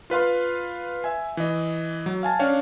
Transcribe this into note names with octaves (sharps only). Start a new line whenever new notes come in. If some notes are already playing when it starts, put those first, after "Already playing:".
F4 B4 F5 C6
E5 G#5
E3 D#5
F#3
F5 G#5 A5
C#4 D4 C#5 F5 G5